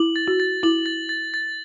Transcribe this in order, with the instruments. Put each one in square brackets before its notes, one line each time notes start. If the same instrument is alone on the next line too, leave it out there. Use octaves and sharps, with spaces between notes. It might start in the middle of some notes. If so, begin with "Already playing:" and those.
Already playing: [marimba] E4 [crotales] F#7
[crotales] A6
[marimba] F#4
[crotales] A6
[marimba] E4 [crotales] F#7
[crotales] A6
A6
A6